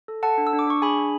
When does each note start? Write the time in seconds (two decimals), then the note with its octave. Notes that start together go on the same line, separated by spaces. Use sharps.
0.08 A4
0.23 A4 F#5 A5
0.38 D4
0.47 E6
0.53 D4
0.59 D6
0.67 D4 C#6
0.82 G#4 G#5 B5
0.97 D4